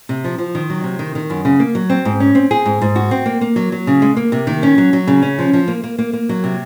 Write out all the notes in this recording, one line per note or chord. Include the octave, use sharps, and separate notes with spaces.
C3
F3
F3
D#3
F#3
C3
D#3
D#3
F#2
C#3
A#3
F#3
C4
G#2
C#4
C4
G#4
G#2
G#2
F#4
C4
A#3
A#3
F#3
F#3
C#3
G#3
A#3
C3
D#3
C#4
F#3
F#3
C#3
C#4
F3
F3
A#3
A#3
A#3
A#3
F#3
C3